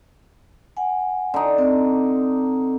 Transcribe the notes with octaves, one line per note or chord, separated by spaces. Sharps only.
F#5 G#5
D3 D#4
C4